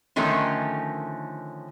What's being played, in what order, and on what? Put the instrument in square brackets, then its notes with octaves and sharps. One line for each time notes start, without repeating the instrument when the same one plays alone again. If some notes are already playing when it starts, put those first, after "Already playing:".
[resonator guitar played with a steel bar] D3 D#3 F3 A3 C#4 A#4